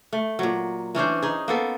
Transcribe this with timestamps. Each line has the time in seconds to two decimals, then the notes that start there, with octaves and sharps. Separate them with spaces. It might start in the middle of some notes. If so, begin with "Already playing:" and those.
0.13 A3
0.39 A#2 F#3
0.95 E3 C#4 D4 C5
1.23 D#4 G#4
1.48 A#3 B3 A4